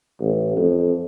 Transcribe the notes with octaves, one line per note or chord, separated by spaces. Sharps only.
A1
F2